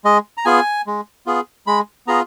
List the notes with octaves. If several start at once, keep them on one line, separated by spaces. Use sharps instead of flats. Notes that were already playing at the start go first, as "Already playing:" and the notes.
G#3 D#5
A#5
B3 F4 G#4 G#5
G#3
B3 F4 G#4
G#3 B5
B3 F4 G#4 A#5